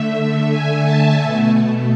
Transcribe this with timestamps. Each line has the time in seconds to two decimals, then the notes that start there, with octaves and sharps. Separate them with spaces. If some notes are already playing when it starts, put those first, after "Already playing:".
Already playing: D3 A3 E5
0.51 G#5
0.84 A5
1.19 B2 A3